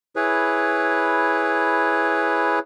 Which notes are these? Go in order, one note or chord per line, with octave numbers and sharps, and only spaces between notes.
E4 G#4 B4 C#5